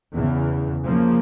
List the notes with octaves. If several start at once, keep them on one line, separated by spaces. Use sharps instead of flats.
E2 C#3 E3
C#3 F3 A#3